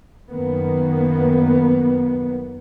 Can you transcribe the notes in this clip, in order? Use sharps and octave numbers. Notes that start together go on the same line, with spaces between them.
F#2 D#3 A#3 B3